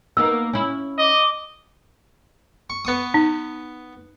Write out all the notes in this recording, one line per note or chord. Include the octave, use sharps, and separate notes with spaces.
A#3 B3 D#4 E6
C#4 E4
D#5 D6
C#6
B3 C#6 D#6
D#4